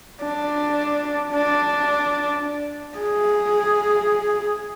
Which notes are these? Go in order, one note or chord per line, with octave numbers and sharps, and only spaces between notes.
D4
D4
G#4